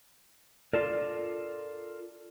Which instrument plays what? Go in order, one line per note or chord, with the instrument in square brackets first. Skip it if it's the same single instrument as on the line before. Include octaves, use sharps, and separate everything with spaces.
[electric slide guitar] F4 A4 A#4 [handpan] D5